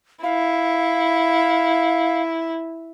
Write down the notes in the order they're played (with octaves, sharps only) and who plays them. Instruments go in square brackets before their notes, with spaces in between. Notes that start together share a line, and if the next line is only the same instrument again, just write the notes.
[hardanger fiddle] E4 [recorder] F5